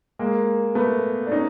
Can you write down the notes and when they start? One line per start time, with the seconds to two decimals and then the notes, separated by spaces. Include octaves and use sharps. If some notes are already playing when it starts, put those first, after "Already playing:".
0.19 G#3 A#3
0.75 A3 B3
1.27 D4
1.31 C#4 D#4